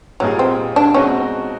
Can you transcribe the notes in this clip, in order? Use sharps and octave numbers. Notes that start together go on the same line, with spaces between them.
A#2 F#3 G3 A#3 D#4 G#4
C4
D4
B2 G#3 C4 C#4 D#4 F#4